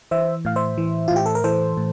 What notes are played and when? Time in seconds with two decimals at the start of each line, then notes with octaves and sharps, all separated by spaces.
0.11 E3 C5 E5
0.45 A2 F5
0.56 C5 E5
0.78 E3
1.08 A2 F4
1.16 G4
1.26 A4
1.35 A#4
1.44 E3 A4 C5
1.77 A2